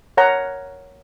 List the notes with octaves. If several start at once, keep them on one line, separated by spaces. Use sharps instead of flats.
A#4 C#5 F#5 A#5